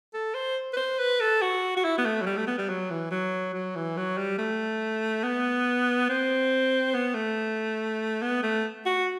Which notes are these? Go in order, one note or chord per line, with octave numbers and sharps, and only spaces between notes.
A4
C5
B4
C5
B4
A4
F#4
F#4
E4
B3
A3
F#3
G3
A3
B3
G3
F#3
E3
F#3
F#3
E3
F#3
G3
A3
B3
C4
B3
A3
B3
A3
F#4